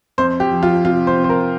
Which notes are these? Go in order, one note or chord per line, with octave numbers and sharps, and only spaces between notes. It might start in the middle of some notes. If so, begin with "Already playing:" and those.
F2 C5
G4
F3
F4
C3 F4
C5
F2
C5
A#4